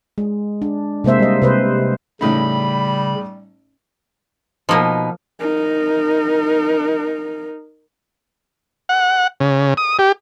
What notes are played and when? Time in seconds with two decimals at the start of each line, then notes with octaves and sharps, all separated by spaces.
0.18 G#3
0.62 D4
1.04 C3 G#3 A#3 C5 E5
1.19 G3 D#5
1.42 C3 B4 C5
2.21 A1 A2 C#3 G3 D#4 B5
4.69 B2 F3 A#3 D#4
5.40 D#4 A#4
8.89 F#5
9.40 C#3
9.77 D#6
9.99 G4